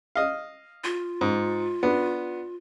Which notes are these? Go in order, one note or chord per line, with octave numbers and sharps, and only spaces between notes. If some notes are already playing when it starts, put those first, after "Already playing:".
D#5 F5
F4
G#2
B3 D4